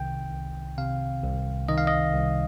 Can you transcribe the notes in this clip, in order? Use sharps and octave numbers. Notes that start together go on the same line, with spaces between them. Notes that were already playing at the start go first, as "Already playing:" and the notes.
Already playing: C2 C3 D#3 G5
C2
C3 F5
C2
D#3 D#5
F5
D#5
C2